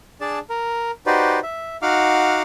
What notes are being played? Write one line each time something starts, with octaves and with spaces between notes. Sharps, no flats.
D4 G#4 D5 A5
A#4
D#4 F#4 G4 B4 C5 D5
E5
D#4 F#4 F5 F#5 D6 F6